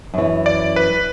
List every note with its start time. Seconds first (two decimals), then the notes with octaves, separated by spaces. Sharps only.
0.14 F#2 E3
0.46 D5
0.76 B4